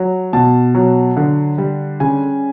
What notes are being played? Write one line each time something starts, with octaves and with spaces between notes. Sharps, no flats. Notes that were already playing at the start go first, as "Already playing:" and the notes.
Already playing: F#3
B2 A5
F#3
D3
G3
C#3 G#5